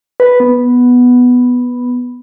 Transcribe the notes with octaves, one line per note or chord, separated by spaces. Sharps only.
B4
B3